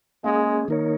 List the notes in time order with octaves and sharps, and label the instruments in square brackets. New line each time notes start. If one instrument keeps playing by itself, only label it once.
[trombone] G#3 [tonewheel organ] A#3 C#4 G#4
[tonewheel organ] D#3 A#3 D#4 A#4 C#5